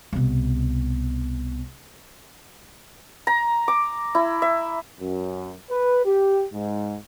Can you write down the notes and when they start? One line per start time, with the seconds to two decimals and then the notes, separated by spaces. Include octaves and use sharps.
0.13 C2 B2
3.27 A#5
3.68 D6
4.15 E4
4.42 E5
5.00 F#2
5.71 B4
6.05 G4
6.53 G#2